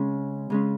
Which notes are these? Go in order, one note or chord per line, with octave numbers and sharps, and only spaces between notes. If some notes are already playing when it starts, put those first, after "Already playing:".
Already playing: C#3 G#3 C#4
C#3 G#3 C#4